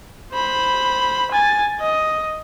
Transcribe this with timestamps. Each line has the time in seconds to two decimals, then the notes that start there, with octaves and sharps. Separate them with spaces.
0.33 C5 B5
1.32 G#5 A6
1.81 D#5